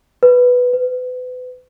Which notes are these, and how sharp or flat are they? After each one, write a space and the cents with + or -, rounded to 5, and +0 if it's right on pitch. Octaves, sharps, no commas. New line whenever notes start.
B4 +0
B4 +35